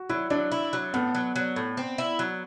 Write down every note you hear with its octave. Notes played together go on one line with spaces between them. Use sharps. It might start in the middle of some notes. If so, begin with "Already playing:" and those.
Already playing: F#4
F#3 E4
F#3 D4
E4
F#3
A2 B3
F#3
F#3
A2
C4
E4
F#3